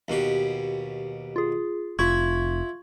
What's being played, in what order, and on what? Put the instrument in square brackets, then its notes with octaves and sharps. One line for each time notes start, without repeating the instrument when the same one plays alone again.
[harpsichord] D#2 B2 G4
[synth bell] F4 G#4
[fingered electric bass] F1 [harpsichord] E4 [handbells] F4 G#6 [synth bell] C#6